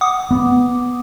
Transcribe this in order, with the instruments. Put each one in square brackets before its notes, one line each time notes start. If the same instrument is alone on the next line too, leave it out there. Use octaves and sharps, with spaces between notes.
[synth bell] F#5 D6 D#6
[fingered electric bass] B3